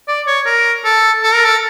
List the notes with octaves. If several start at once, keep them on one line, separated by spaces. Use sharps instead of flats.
D5
C#5
A#4
A4
A4
A#4
A4